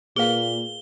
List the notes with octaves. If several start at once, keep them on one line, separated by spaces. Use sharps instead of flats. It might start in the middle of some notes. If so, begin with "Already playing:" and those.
A#2 A#3 G#4 B4 F5 G7